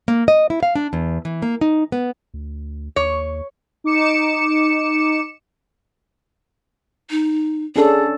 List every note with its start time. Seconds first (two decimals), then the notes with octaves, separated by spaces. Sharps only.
0.08 A#3
0.28 D#5
0.50 E4
0.63 F5
0.75 D4
0.93 E2
1.25 E3
1.42 A#3
1.61 D#4
1.92 B3
2.34 D2
2.96 D#2 C#5
3.84 D#4 D6 C#7 E7
7.10 D#4
7.76 C#4 D4 G#4 A4